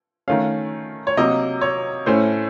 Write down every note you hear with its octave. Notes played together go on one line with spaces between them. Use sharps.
D#3 A3 C#4 F5
C#5
C3 F#3 A#3 D#5
C#5
A2 A3 C#4 C5